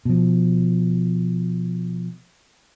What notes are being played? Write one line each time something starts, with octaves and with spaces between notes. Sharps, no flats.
B2 F3